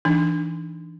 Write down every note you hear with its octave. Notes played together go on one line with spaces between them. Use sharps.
E3 D4 D#4